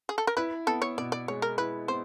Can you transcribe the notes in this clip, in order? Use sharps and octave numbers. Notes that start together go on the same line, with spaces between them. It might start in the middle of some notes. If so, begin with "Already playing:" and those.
G#4
A4
A#4
E4 B4
B3 A4
C#5
B2 D5
D5
G#3 C#5
A#4
E4 B4
B3 C5